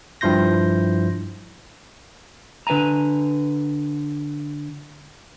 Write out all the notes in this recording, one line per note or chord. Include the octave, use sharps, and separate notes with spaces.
G2 F3 E4 C6 G6 A#6
D3 B4 F5 G#5 A#5